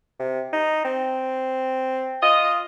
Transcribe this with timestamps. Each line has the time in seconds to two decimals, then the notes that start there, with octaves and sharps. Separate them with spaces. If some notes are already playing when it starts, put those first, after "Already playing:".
0.19 C3
0.53 D#4
0.85 C4
2.23 F4 D#5